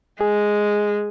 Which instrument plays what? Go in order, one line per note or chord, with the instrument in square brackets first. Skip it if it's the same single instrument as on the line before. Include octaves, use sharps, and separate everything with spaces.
[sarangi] G#3 [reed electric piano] G#4